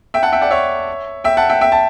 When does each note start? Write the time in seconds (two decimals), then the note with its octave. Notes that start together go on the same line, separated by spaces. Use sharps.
0.14 E5 G5
0.23 F#5 A5
0.32 E5 G5
0.41 D5 F#5
0.51 C#5 E5
1.24 E5 G5
1.37 F#5 A5
1.50 E5 G5
1.61 E5 G5
1.72 A5